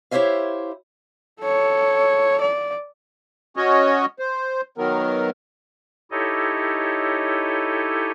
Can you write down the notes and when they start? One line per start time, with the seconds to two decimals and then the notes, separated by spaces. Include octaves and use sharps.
0.11 E4 G4 C5 C#5 E5 F5
1.42 A4 C#5
2.41 D5
3.56 C#4 F#4 C#5 D#5
4.19 C5
4.78 D#3 F#3 B3 A#4
6.11 D#4 E4 G4 A4 C#5 D#5